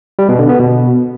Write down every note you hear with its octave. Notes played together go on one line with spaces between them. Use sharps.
G3
B2
D3
B3
B2